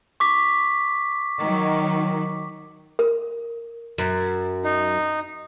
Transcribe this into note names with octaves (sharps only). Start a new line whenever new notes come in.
C#6 D6 B6
D#3 F#3
A#4
F#2
D#4